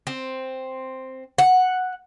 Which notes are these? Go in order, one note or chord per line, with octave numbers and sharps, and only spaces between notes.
C4
F#5